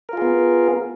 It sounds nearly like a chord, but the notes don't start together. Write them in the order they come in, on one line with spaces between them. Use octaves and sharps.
A#4 F4 G#4 B3